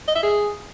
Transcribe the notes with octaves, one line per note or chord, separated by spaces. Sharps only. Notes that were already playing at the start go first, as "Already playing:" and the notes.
D#5
E5
G#4